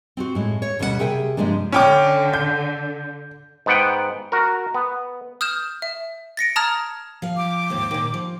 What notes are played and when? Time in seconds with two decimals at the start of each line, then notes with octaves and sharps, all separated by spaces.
0.17 C4 F4 F#4
0.35 A2 G#3
0.62 C#5
0.79 D2 B2 G3 C#4 G4 F#5
0.99 C3 G#4 A#4 E5 G5 G#5
1.37 G2 C3 F3 G#3 A#3 D4
1.72 D3 C#4 G5 D6
2.33 G6
3.66 G#2 B3 F#5 G5
4.32 F#4 A#4
4.74 B3
5.41 D#6 F6 G6 E7
5.82 E5
6.37 A6 A#6 C#7 D7
6.56 A5 A#5 D#6 F6 G#6 A6
7.22 F3 F5
7.37 D6
7.70 D#2 G#2
7.91 A#2 D#3
8.14 F3